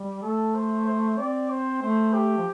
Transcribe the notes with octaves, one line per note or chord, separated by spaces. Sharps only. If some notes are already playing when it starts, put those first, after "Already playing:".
Already playing: G3
A3 A4
C5
C5
C4 D5
C5
A3 C5
G4
F3